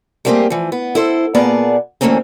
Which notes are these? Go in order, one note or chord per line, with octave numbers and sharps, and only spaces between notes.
G3 A3 A#3 C4 G4 G#4
E3 F3
B3
E4 A4 C5
A#2 A#3 B3 G#4 D5 A5
D2 E3 A3 A#3 C4 C#4